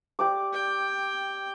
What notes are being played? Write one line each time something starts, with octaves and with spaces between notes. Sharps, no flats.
G4 D5 D6
G5